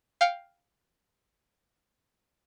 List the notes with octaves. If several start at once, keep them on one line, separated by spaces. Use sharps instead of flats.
F5 G5 F6 C#7